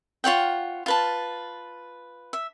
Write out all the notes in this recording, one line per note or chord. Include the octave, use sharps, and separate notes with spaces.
F4 C#5 F#5 G5
F4 B4 A5
E5